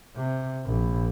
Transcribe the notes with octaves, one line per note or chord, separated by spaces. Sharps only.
C3
A#1